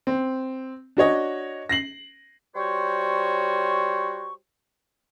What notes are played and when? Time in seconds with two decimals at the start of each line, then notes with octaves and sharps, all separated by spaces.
0.07 C4
0.97 D4 F#4 C#5 D#5
1.69 A#6 C7 F#7
2.55 G3 F#4 C5 C#5 C#6